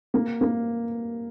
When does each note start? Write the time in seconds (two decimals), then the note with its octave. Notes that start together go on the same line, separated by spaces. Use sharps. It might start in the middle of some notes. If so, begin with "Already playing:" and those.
0.14 A#3
0.41 A#3